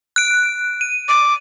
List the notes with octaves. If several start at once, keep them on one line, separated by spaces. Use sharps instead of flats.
F#6 D7
D#7
D6